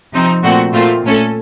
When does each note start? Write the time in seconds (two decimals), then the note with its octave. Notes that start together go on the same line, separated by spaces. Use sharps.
0.12 C3 F3 C4 D#4
0.42 A#2 A3 C4 F#4
0.73 A#2 A3 C4 F4
1.04 A#2 A3 C#4 A4